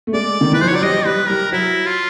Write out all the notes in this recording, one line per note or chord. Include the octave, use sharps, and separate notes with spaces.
A3
G#3 D5
D#3
E3 B4
F3 C5
C#5
F#3 D5
G3 D#5
G3 B4
G3 A#4
F#3 E4
F4